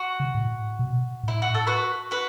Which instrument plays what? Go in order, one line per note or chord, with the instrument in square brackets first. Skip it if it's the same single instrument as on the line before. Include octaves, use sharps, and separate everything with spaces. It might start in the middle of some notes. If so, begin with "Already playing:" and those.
Already playing: [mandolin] F#4
[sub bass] C#3
A2
B2
[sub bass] A2 [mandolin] E4
[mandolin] F#4
A4
F#4 B4
F#4 B4